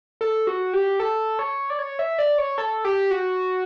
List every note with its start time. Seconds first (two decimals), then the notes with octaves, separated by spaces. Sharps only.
0.21 A4
0.47 F#4
0.73 G4
1.00 A4
1.39 C#5
1.70 D5
1.79 C#5
1.99 E5
2.19 D5
2.38 C#5
2.58 A4
2.85 G4
3.11 F#4